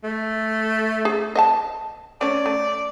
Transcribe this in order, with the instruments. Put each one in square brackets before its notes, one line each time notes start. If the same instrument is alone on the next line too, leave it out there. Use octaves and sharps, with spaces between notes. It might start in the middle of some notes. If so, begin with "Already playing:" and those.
[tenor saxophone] A3
[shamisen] G#4
D#5 F5 A5
[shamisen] A3 C#4 [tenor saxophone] D5
[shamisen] A3